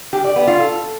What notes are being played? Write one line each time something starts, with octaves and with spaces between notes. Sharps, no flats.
G4
D5
B3
F4
A4